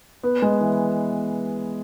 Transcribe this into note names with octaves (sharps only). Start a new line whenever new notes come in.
B3
G#3
E3